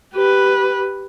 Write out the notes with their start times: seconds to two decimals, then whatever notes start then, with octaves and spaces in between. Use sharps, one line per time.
0.15 G4 B4